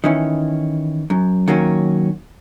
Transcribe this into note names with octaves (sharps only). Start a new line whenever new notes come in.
D#3 E3 C#4
F#2
D#3 F#3 A#3 C#4